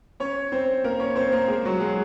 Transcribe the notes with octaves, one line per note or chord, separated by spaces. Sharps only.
C#4 C#5
C4 C5
A#3 A#4
C#4 C#5
C4 C5
A#3 A#4
G#3 G#4
F#3 F#4
G#3 G#4